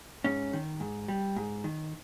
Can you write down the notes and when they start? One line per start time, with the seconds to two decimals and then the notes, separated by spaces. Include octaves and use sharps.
0.24 G#2 C#4
0.53 D#3
0.80 G#2
1.08 G3
1.36 G#2
1.64 D#3